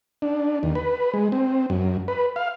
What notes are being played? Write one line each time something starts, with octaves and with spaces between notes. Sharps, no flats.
D4
D#2
B4
G#3
C4
F#2
B4
F5